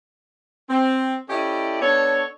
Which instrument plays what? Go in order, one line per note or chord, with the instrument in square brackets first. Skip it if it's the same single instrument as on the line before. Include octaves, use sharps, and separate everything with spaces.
[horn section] C4
C#4 E4 G4 A4 D5 D#5
B3 D4 A4 C#5